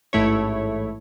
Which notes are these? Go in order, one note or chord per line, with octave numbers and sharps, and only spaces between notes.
A1 G#2 A3 E4 C#5